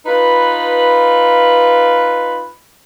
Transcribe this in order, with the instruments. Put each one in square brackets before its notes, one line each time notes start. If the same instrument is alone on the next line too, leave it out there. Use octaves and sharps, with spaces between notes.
[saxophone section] D#4 F4 B4